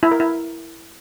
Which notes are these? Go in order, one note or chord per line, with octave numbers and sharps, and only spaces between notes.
E4
A#4
E4